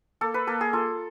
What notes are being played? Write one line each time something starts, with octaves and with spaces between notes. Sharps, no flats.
A#3 A4
B4
A#3 A4
G#4
F4 A4